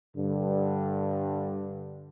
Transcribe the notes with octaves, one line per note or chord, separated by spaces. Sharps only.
G2 D3